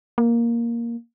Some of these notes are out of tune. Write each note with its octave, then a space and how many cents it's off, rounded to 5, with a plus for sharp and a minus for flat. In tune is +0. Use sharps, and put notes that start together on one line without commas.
A#3 +5